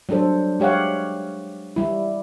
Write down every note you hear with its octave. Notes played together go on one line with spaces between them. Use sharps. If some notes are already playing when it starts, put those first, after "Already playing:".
F#3 G3 D4 A4 C5
G#3 G4 C#5 F5 F#5
G3 E4